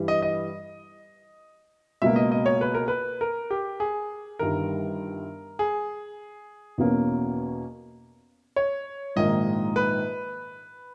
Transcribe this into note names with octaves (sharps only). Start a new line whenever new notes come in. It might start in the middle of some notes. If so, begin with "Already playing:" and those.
Already playing: G2 E3 G3
D#5
D#5
C#2 B2 A#3 E5
D#5
D#5
C#5
B4
A#4
B4
A#4
G4
G#4
G1 G2 D#3 A#4
G#4
E2 B2 A#3 C#4
C#5
A#1 G#2 D#3 A#3 D#4 D#5
B4